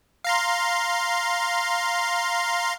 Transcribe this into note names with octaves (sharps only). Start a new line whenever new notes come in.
F5 A#5 C6